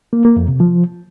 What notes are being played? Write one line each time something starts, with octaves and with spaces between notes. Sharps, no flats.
A#3
A#3
F2
C3
F3